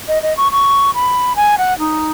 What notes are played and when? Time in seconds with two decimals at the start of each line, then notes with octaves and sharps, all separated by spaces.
0.08 D#5
0.22 D#5
0.37 C#6
0.52 C#6
0.94 B5
1.36 G#5
1.58 F#5
1.79 D#4